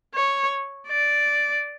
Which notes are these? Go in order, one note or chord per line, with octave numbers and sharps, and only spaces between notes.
C#5
D5